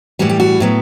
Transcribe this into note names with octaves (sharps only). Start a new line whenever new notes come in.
A2 E3 G3 F#4
G4
F#4
A2 F#3 B3